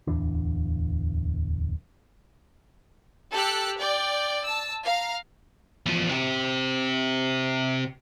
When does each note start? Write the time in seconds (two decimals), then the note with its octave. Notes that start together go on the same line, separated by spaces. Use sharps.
0.07 D1 E2 E3 D4
3.32 G4 A4 A5 E6 F#6
3.80 D5 G5
4.44 A5 E6
4.84 F5 A#5
5.86 E2 F3
6.10 C3 G4